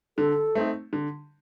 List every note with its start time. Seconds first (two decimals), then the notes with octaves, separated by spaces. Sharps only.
0.18 D3 A4
0.55 A3 C4 D#4
0.93 D3